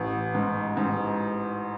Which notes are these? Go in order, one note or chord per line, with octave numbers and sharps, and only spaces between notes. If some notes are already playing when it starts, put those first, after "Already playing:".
Already playing: A1
G#2
G#2